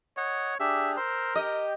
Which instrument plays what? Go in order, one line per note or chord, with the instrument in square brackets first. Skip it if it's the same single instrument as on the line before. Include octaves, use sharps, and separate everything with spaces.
[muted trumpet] C#5 [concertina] D#5 F#5
[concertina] D4 G4 G#4 [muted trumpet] E5
[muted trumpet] A#4 [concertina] C5 C6 E6
[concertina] G4 G5 [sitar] D#5